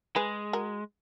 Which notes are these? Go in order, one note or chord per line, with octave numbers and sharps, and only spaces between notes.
G#3 G#4 B4
F#4 A#4